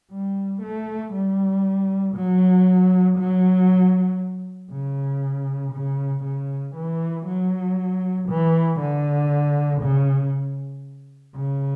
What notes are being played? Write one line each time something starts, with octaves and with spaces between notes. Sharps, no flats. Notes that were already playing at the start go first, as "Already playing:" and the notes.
G3
A3
G3
F#3
F#3
C#3
C#3
C#3
E3
F#3
E3
D3
C#3
C#3